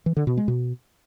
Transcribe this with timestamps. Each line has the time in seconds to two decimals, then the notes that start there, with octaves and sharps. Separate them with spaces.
0.06 E3
0.17 D3
0.27 B2
0.37 G#3
0.48 B2